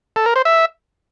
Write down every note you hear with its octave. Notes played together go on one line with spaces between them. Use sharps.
A4
A#4
C5
E5